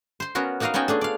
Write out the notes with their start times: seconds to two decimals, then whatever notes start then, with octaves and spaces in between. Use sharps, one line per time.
0.20 C5 C6
0.35 B3 C#4 F#4 A#4
0.60 A#3 D#4 F#4 A#4 D#5 F5
0.74 B3 C#4 D#4 F#4 G5 G#5
0.88 A3 D4 G#4
1.01 D5 F5